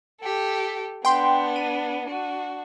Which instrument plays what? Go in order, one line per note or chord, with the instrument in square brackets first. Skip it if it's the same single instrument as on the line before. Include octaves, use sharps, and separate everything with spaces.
[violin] G4 A4
[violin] B3 D4 [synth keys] G5 C6
[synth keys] D#7
[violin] D4 F#4